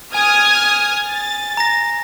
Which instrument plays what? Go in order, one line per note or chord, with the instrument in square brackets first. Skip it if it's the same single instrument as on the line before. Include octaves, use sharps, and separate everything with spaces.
[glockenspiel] G#5 [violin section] D#6 F6 G#6
[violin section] A6
[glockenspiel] A#5 A#6